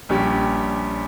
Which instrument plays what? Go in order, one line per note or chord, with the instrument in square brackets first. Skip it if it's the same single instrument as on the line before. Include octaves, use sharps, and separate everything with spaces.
[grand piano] A#1 A#2 G3 C#4 G4